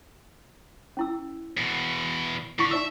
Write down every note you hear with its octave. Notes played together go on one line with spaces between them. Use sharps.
C#4 E4 E6
E2 B2
D3 E4 C#6
D#4 D5 E5 E6